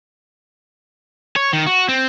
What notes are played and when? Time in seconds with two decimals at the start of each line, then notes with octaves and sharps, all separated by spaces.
1.36 C#5
1.53 D#3
1.66 F#4
1.89 C4